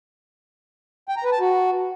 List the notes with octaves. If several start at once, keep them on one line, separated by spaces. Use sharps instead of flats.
G5
A#5
B4
A5
F#4